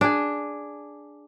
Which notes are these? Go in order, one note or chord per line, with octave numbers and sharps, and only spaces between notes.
D4 G#4